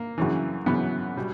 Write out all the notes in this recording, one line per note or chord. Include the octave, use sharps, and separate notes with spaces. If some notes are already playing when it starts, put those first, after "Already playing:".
Already playing: A#3
F#2 C#3 E3
F#2 C#3 E3 B3
B2 G3